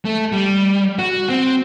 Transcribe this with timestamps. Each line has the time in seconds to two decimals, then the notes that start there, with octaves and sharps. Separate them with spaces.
0.05 A3
0.32 G3
0.99 F#4
1.30 C4